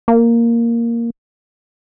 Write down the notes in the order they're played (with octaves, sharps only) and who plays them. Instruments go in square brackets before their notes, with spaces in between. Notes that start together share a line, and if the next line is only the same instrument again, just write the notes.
[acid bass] A#3